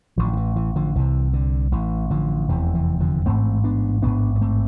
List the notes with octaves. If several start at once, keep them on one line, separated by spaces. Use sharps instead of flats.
A1 A2 D3 F3
D3
E3
E3
D3 F3
C2 C3 E3
D3
A1 A2 E3
D3 F3
F1 E2 C3 E3
E3
D3 F3
A1 G#2 A3 C4
B3 D4
A1 G#2 B3 D4
B3
A3 C4